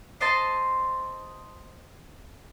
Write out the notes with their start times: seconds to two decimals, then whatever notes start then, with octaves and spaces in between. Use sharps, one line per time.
0.21 C5 D#5 A5 C6